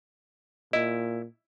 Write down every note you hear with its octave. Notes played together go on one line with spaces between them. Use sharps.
A#2 E4 D#5